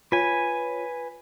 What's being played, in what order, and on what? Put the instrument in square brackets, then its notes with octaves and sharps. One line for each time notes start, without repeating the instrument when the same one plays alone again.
[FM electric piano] F4 C#5 [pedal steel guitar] B4 G#5